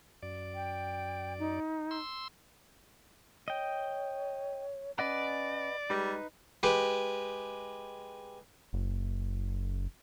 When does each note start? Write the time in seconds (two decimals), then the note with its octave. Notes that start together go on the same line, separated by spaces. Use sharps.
0.23 F#2 D5
0.54 G5
1.39 D#4
1.91 C6 E6
3.48 C#5 D#5 G5
4.99 C#4 B4 D5 D#5 F#5
5.90 G3 G#3 D#4 B4
6.63 G#3 G4 B4
8.73 F#1